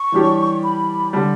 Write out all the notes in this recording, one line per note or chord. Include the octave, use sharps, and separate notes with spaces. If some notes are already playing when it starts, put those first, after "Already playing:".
Already playing: C#6
E3 G3 D4 G4 C#5
B5
D3 G3 A5